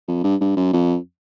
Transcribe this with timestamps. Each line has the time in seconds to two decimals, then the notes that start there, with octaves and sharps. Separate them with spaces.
0.08 F2
0.24 G2
0.41 G2
0.57 F#2
0.73 F2